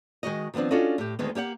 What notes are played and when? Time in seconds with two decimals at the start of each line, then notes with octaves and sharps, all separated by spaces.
0.23 D#3 G#3 F#4 D#5
0.54 D#3 F3 B3 C4 D4
0.71 C#4 D4 F4 F#4 A4 D#5
0.98 A2 G4
1.19 D2 D#3 G#3 B3
1.35 A#3 G4 D5 F#5